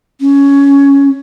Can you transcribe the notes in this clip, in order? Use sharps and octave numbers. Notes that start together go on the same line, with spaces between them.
C#4